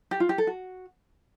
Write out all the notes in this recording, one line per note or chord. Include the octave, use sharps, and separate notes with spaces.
G4
F4
G4
A4
F#4